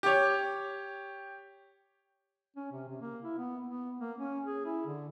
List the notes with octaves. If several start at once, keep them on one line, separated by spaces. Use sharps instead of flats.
G4 C#5
C#4
C3
C3
A#3
E4
B3
B3
A#3
C#4
G#4
E4
D3